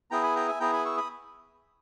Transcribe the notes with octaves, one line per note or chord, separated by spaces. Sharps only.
B3 E4 G#4 G5 A#5
G#5 B5
G5 A#5
E5 G#5
B3 E4 G#4 G5 A#5
G#5 B5
C#6 E6
B5 D#6